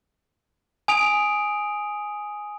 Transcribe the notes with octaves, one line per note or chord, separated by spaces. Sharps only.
G#5 D#6 D7 F7